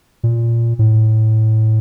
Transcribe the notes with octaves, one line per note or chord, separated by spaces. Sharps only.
A#2
A2